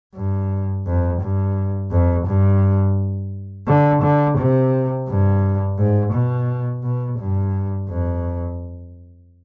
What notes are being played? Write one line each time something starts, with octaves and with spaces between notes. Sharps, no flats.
G2
F2
G2
F2
G2
D3
D3
C3
G2
G#2
B2
B2
G2
F2